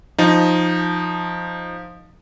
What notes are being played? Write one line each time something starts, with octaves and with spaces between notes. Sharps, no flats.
F3 D#4